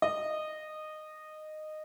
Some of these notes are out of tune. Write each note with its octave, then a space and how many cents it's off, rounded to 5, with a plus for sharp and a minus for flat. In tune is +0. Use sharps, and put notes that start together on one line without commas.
D#5 -15